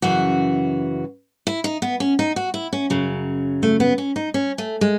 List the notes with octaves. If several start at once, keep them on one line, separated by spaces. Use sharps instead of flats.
F#2 C#3 E3 F#4
E4
D#4
B3
C#4
D#4
F#4
E4
C#4
F#2 C#3 F#3
A3
B3
C#4
D#4
C#4
A3
G#3